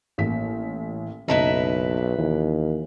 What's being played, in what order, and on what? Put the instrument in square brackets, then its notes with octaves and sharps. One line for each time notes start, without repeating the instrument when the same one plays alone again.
[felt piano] A1 A#3 B6
[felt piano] F#1 A5 E7 [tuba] B1 [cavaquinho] D#4 E4 B4
[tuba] D#2 [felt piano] E3